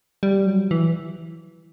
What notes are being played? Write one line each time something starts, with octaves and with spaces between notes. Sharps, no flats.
G3
F#3
E3